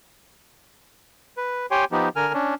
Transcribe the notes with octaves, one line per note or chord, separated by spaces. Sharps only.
B4
G4 C#5 G5 G#5 C6
F3 B3 D#4 G4
D3 A#4 G#5 F6
C#4 D4